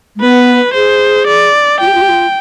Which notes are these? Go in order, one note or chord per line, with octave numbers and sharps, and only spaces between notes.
G#3
B3 B4
G#4 C5
D5
F4 G5
G4
F4
G4
F4